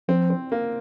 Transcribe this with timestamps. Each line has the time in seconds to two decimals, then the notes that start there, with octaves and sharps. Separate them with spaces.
0.08 F3 C4
0.30 C4
0.52 A#3